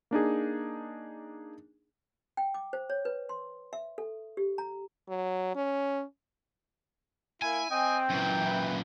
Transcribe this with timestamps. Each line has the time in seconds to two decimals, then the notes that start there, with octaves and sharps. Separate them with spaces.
0.11 A#3 D4 D#4 G#4
2.37 G5
2.54 D6
2.73 C5
2.90 C#5
3.05 B4
3.29 C6
3.73 E5
3.98 A4
4.37 G4
4.58 A#5
5.09 F#3
5.55 C#4
7.42 A#3 E4 G#5
7.71 C4 D#5 G5
8.10 F#2 A#2 E3
8.45 B4 E5